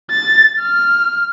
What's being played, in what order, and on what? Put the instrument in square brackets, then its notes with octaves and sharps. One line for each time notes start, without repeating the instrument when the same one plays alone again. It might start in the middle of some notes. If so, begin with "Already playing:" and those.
[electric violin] A6
F6